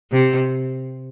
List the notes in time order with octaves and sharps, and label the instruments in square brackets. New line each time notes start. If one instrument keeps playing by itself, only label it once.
[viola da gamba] C3